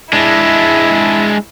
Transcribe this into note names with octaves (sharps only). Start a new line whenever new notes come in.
G#3 D4 E4